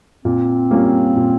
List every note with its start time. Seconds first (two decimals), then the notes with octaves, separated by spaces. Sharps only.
0.25 A#2 C4
0.71 G3 A#3 C#4 F4
1.16 A#2